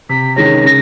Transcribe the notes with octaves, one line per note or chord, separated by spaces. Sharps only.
C3 B6
D#3 G#3 C#4 A#6
C#3 A#6